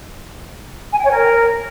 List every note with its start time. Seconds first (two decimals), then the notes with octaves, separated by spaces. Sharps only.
0.92 G#5
0.99 G5
1.05 C#5
1.11 A#4